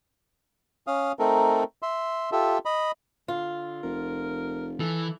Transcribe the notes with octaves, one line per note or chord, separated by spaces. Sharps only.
C#4 F5 D#6
A3 C4 D#4 A4 A#4
E5 C6
F4 G4 A4 E5
D#5 B5
D3 F4
F1 A#4
E3 A4